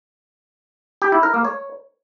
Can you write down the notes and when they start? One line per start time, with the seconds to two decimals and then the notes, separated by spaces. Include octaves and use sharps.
1.02 G4
1.12 E4
1.23 A#4
1.34 A#3
1.45 C#5